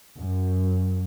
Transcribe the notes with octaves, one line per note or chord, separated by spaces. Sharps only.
F#2